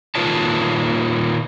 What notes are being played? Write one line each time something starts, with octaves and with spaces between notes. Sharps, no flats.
A#2 D#3 F4 B4 C#5 A5